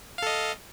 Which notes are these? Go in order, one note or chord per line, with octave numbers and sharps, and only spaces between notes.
A4 D#5 F5